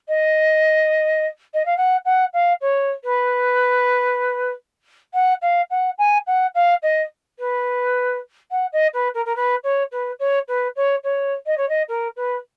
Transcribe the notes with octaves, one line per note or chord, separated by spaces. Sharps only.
D#5
D#5
F5
F#5
F#5
F5
C#5
B4
F#5
F5
F#5
G#5
F#5
F5
D#5
B4
F#5
D#5
B4
A#4
A#4
B4
C#5
B4
C#5
B4
C#5
C#5
D#5
C#5
D#5
A#4
B4